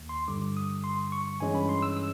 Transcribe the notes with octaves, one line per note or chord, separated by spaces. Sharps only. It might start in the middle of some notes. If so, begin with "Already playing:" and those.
Already playing: D#2
C6
G2 D3 G3 D6
D#6
C6
C#6
G2 E3 G#3 C#4 G#5
B5
C6
E6
E6